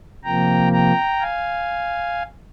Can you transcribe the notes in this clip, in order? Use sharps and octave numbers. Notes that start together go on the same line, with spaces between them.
C3 F3 A#3 G5 A#5
G5 A#5
F5 G#5